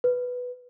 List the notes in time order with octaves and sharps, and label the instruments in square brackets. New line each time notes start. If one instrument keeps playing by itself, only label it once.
[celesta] B4